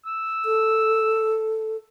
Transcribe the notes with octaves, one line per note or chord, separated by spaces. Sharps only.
E6
A4